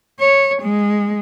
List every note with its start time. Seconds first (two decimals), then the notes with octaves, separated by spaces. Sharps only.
0.19 C#5
0.62 G#3